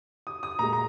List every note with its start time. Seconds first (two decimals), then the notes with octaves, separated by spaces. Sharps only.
0.27 D#6
0.43 D#6
0.59 A#2 G#3 A#5
0.73 A#5